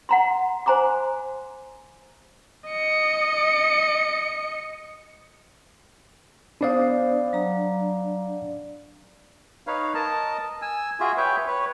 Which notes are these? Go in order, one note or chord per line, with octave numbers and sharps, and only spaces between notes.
F#5 A#5 C6
C5 G#5 A#5 C6 D6
D#5 C#7
B3 D4 C5 D5 F5 D#6
F#3 A#5
D#4 B4 C#5 F5
A#4 D#5 A5
G#5 E6
F4 F#4 G#4 E5
B4 C#5 E5 G5
B4 C#5